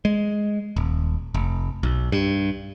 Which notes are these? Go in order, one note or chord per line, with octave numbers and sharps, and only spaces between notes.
G#3
D#1
F1
B1
G2